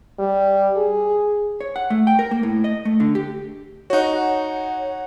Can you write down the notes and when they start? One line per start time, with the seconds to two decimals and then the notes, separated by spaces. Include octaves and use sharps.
0.19 G3
0.77 G#4
1.61 C#5
1.76 F#5
1.90 A3
2.07 G5
2.19 A#4
2.31 A#3
2.43 A2
2.64 D#5
2.85 A3
3.00 D3
3.15 G4
3.90 D#4 F#4 C#5 F#5